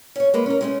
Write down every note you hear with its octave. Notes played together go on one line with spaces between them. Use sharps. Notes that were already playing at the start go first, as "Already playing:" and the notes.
C#4 C#5
G#3 A#3 B4
C#4 A#4
G#3 A3 C#4